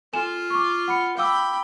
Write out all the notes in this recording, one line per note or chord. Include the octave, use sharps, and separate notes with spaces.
F4 A4 G#5 E7
C#6 D6
F#5 B5 C#7
F5 G5 B5 D6 E6